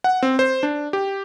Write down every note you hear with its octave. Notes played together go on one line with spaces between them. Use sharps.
F#5
C4
C5
D4
G4